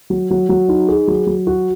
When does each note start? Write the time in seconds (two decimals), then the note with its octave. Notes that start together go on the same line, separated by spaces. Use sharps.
0.10 F#3
0.31 F#3
0.49 F#3
0.69 D#4
0.88 G#4
1.08 F#3
1.27 F#3
1.47 F#4